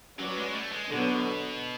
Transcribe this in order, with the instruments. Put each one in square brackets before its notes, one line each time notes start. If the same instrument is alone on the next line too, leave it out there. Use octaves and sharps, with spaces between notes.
[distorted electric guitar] F#3 [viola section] C#4 F#4 B4 D5
[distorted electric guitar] G#3
A3
G#3
[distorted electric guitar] B2 [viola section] D3 F#3 B3